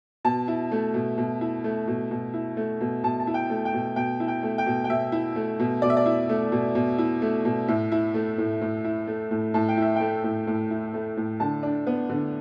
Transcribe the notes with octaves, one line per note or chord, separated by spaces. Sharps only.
B2 A5
E4
A3
B2
B2
E4
A3
B2
B2
E4
A3
B2
B2 A5
A5
E4
G5
A3
G5
B2
B2 G5
E4
G5
A3
G5
B2
G5
B2 E5
E4
A3
B2
B2 D5
E5
D5
E4
A3
B2
B2
E4
A3
B2
A2 E5
E4
A3
A2
A2
E4
A3
A2
A2 A5
G5
E4
E5
A3 G5
A2
A2
E4
A3
A2
D3 A5
D4
B3
D3